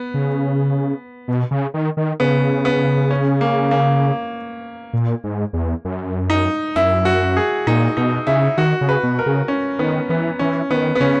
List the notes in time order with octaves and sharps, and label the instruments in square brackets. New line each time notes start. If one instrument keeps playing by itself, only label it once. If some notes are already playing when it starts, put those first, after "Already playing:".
Already playing: [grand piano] B3
[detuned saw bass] C#3
B2
C#3
D#3
D#3
[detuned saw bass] C#3 [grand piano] B3
[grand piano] B3
C#4
A#3
A#3
[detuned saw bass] A#2
G#2
E2
F#2
[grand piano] D#4
[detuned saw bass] F#2 [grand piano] E4
[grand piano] F#4
G#4
[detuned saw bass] A#2 [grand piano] D#4
[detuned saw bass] B2 [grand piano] D#4
[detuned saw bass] C#3 [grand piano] E4
[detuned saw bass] D#3 [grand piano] F#4
[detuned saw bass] C#3
[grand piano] B4
[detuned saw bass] B2
[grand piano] A#4
[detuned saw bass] C#3
[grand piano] C#4
[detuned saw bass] D#3 [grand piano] B3
[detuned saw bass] E3 [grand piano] B3
[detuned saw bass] E3 [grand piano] C#4
[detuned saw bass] D#3 [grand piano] B3
[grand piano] B3
[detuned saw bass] C#3 [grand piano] C#4